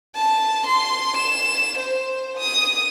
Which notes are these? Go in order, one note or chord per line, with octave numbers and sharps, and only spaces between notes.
A5
C6
E7
C5
D#6